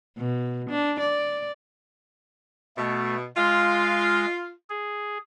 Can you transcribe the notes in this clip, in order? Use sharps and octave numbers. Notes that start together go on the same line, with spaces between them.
B2
D4
D5
B2 A3
G#3 F4
G#4